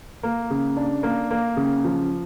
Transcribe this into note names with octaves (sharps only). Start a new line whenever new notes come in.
A#3
C#3
D4
A#3
A#3
C#3
F3